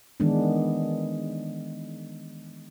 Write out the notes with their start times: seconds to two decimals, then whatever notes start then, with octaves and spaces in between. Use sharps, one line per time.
0.20 D#3 E3 G#3 B3 D4